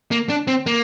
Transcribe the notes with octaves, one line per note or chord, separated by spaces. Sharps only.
A#3
D4
C4
A#3